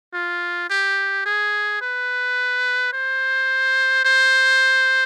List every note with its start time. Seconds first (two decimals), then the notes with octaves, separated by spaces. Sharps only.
0.14 F4
0.69 G4
1.26 G#4
1.81 B4
2.93 C5
4.05 C5